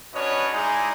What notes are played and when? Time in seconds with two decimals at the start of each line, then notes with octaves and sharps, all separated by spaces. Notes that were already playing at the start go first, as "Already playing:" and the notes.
0.14 C#4 D4 F#4 B4 C#5 D#5
0.52 G#3 D#4 E4 G#4 D5 A#5